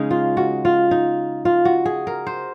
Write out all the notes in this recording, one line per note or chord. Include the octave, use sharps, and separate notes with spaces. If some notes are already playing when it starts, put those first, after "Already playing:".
Already playing: C#3 G#3 C#4 D#4
F4
F#4
F4
D#4
F4
F#4
G#4
A#4
C5